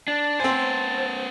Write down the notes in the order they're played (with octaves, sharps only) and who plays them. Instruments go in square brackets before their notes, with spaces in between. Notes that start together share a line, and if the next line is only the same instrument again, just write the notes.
[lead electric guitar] D4 [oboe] A5
[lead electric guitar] B3 C5 [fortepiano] C4 G#5